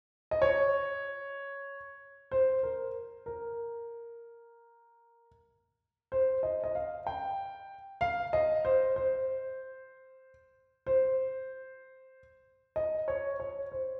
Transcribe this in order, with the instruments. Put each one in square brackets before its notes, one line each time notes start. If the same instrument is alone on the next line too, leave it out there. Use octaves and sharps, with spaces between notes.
[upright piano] D#5
C#5
C5
A#4
A#4
C5
D#5
D#5
F5
G5
F5
D#5
C5
C5
C5
D#5
C#5
C#5
C5